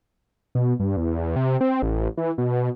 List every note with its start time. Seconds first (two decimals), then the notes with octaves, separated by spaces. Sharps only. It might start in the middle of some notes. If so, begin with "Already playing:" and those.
0.55 B2
0.80 G2
0.97 E2
1.36 C3
1.61 C4
1.82 A1
2.17 E3
2.38 B2